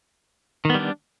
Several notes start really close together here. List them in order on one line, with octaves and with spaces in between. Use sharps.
D#3 B3 G3 D4